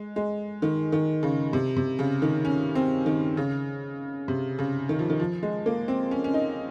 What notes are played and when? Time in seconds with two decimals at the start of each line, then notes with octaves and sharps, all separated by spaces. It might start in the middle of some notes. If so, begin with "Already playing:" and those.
Already playing: G#3
0.16 G#3
0.62 D#3
0.92 D#3
1.23 C#3
1.53 C3
1.76 C3
1.99 C#3
2.22 D#3
2.45 C#4
2.75 C4
3.06 D#3
3.37 C#3
4.28 C3
4.59 C#3
4.89 D#3
4.99 F3
5.10 D#3
5.20 F3
5.43 G#3
5.66 A#3
5.88 C4
6.11 C#4
6.24 C#4
6.34 D#4